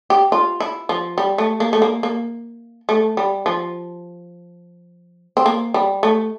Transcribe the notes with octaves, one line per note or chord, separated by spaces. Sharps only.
G4
F4
E4
F3
G3
A3
A#3
A3
A#3
A#3
A3
G3
F3
C4
A#3
G3
A3